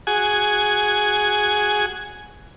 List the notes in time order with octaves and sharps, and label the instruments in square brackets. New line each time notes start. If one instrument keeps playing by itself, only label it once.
[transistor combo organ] F#4 G#4 G#5